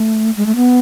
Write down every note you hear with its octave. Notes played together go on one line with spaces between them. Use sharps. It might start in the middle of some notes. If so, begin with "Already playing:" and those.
Already playing: A3
G#3
A3
B3